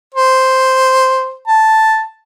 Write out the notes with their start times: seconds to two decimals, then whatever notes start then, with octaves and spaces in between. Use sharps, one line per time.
0.14 C5
1.47 A5